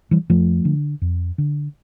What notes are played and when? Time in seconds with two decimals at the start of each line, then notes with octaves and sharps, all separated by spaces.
0.11 E3 G3
0.30 F2 F3 A3
0.65 D3
1.02 F2
1.38 D3